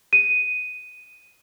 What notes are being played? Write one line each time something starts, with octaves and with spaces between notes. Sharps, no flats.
D#7